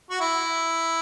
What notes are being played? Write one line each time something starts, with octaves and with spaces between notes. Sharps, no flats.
F#4
E4